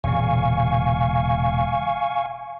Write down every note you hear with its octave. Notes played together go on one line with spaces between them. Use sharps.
E1 A#2 C#3 F5 G#5 C#6